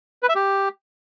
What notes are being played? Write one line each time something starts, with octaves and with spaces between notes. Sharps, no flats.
B4
E5
G4